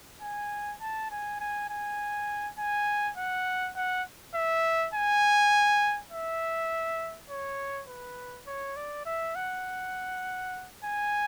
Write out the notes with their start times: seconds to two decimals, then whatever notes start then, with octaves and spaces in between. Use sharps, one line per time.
0.21 G#5
0.81 A5
1.11 G#5
1.40 G#5
1.70 G#5
2.58 G#5
3.17 F#5
3.76 F#5
4.34 E5
4.94 G#5
6.12 E5
7.30 C#5
7.88 B4
8.47 C#5
8.76 D5
9.06 E5
9.35 F#5
10.84 G#5